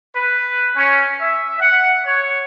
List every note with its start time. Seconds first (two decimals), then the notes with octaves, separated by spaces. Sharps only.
0.14 B4
0.74 C#4
1.20 E5
1.60 F#5
2.05 C#5